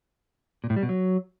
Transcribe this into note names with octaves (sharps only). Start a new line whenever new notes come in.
A#2
A2
G3
B2
F#3